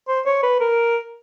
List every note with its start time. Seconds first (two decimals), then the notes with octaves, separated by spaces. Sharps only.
0.08 C5
0.26 C#5
0.43 B4
0.60 A#4